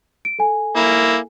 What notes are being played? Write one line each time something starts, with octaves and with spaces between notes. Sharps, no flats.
D7
A4 G#5
A#3 E4